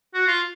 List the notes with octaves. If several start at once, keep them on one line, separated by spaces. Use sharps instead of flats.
F#4
F4